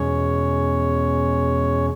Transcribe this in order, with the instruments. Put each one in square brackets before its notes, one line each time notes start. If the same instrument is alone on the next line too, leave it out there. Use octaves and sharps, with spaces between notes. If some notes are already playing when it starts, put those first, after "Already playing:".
Already playing: [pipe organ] E2 B2 G#3 C#4 C#5